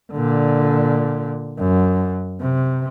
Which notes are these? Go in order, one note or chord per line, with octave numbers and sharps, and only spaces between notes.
A#2 D3
F#2
C3